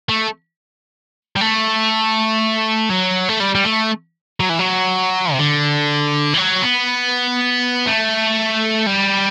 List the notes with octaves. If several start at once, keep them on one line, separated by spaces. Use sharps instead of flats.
A3
G3
A3
F#3
A3
G3
G3
A3
F#3
E3
F#3
C3
D3
E3
F#3
B3
A3
G3